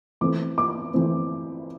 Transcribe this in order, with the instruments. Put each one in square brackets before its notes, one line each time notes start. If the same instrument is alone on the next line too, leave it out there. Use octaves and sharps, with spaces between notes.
[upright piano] E3 A3 C4 D6
D6
E3 A3 C4